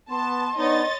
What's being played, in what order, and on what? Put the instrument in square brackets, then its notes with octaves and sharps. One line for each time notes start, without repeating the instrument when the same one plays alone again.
[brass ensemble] B3 [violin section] A5 [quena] C6
[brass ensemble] B3 D4 D#4 [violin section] C#5 D#5 A6